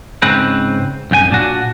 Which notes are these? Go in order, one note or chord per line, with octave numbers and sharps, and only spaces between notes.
G#2 C#3 C4 B4
C2 F#2 G5 G#5
A#2 D4 F#4